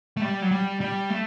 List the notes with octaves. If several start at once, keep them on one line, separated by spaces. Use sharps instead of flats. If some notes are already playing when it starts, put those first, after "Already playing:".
A3
G3
F#3
G3
G3
A3